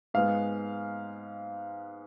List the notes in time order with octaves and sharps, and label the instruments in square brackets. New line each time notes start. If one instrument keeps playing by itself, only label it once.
[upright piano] G#2 G#3 B3 F5